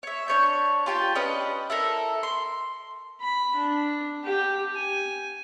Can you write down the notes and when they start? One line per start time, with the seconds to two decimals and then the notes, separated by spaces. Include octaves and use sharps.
0.03 C#5 E5
0.28 D4 C#5 G6
0.86 F4 G4 G5 A5
1.15 C#4 D4 B4 D#5
1.70 E4 A4 A#4
2.23 C6
3.21 B5
3.55 D4
4.24 G4
4.74 G#5